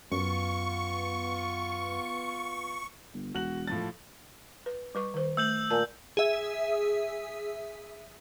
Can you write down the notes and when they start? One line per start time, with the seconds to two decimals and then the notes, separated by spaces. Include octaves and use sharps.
0.12 F#2 B3 F4 C#6
3.14 G1
3.34 E1 F#4 F#6 F#7
3.67 A2 F3 A6
4.66 B4
4.95 G3 B4 C#6
5.14 D#3 C5
5.37 A3 E6 G6 F#7
5.70 A#2 G#5 A5
6.17 G#4 E5